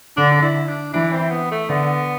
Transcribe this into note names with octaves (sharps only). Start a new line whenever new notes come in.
D3 D4
D4
E4
D4
E3 D4
C4
B3
A3
D3 B3